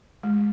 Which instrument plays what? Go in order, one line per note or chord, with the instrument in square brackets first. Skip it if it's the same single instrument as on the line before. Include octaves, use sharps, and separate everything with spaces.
[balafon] G#3